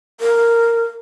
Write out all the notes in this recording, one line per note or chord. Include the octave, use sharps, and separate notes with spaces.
A#4